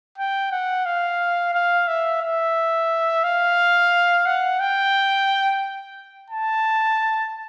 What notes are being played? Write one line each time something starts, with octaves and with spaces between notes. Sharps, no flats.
G5
F#5
F5
F5
E5
E5
F5
F#5
G5
A5